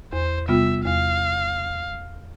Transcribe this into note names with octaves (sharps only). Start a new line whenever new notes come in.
E2 C5
C3 G3 B3 F4 E5
E2 F5